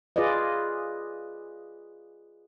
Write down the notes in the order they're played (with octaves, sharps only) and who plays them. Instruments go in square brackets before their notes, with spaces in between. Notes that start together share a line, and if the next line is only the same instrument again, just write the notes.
[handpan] F4 G#4 B4 D5 D#5